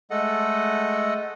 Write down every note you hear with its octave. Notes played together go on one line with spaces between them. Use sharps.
G#3 A3 A4 D#5 F#5